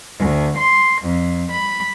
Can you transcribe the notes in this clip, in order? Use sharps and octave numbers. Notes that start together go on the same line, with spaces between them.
D2
C6
F2
B5